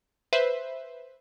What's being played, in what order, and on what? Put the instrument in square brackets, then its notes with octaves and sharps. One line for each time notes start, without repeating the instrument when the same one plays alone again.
[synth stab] B4 C5 E5